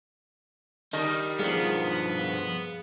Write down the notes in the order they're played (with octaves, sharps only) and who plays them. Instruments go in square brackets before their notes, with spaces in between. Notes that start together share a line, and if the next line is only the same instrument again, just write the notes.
[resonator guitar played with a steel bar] D#3 [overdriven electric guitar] G3
[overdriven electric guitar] G2 F3 [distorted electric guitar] B3 [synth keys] G#4 F5